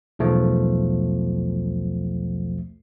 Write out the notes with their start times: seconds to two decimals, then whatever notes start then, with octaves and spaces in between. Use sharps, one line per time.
0.19 B1 E2 F3 A3